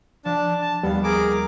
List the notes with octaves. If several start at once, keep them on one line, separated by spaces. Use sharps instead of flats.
F3 D4 A5
A5
D#2 G3 B3 F5
G#4 A#4 D6